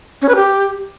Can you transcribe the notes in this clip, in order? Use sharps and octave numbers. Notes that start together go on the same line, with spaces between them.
C#4
B4
G4